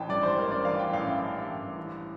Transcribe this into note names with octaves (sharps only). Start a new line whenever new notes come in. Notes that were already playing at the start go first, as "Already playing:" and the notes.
Already playing: A1 E3 G5 A5
G2 D5
C5
A1 A#4
D5
E3 F5
G5
A1 F5
E5
G2 G5
A1
E3